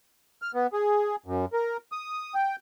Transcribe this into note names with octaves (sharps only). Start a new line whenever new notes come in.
F6
B3
G#4
F#2
A#4
D#6
G5